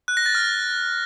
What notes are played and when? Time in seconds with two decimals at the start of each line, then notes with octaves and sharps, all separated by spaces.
0.08 F#6
0.17 A#6
0.26 A6
0.35 F6